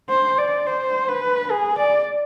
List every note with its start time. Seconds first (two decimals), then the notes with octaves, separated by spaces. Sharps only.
0.10 C5
0.38 D5
0.67 C5
1.08 B4
1.51 G#4
1.79 D5